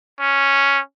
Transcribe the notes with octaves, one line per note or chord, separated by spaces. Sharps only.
C#4